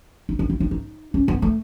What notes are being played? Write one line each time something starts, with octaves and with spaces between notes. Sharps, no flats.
D#4
D#4
E4
D#4
D#4
C#4
B3
A3